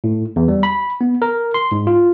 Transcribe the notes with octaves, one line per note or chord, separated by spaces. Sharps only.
A2
E2
G3
B5
B3
A#4
C6
G#2
F4